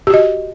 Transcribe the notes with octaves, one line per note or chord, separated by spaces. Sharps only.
F#4 G4 D#5